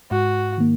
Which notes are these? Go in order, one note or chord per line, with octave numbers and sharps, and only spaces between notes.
G#2 F#4
D#3 A#3